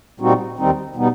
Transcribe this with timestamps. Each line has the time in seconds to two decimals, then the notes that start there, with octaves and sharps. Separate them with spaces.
0.20 A#2 G3 C4 D#4 F#4
0.57 D#2 D#3 G3 C4 D#4
0.95 B2 G3 B3 D#4